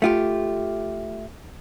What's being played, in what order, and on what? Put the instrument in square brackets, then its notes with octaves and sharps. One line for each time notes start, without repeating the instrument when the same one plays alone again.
[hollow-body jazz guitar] A3 F4 G4